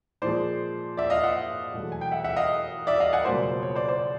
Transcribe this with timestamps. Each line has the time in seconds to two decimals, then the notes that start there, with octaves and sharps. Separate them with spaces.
0.22 A#2 F3 G#3 C5 D5
0.97 D5 E5
1.10 D#5 F5
1.24 E5 F#5
1.74 E2 B2 F#3 A3
1.92 G#5
2.01 G5
2.11 E5 F#5
2.24 E5 F#5
2.36 D#5 F5
2.87 D5 E5
3.00 D#5 F5
3.13 F#5 G#5
3.25 C#2 B2 F#3 A#3 C5 D5
3.39 C#5
3.51 C5
3.63 C#5
3.75 C5 D5
3.88 C5 D5